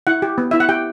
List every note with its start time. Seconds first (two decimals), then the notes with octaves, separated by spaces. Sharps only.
0.07 E4 F#5
0.22 G4
0.38 B3
0.51 E4 E5
0.60 F#5
0.69 G4 G5